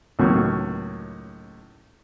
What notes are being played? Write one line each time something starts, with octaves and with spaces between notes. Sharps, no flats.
C#2 A2 D#3 F#3 A#3 C#6